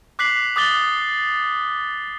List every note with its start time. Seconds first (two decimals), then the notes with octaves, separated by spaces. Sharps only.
0.19 D6 F#6 B6 C7 F#7
0.56 D6 D#6 F#6 A6 G7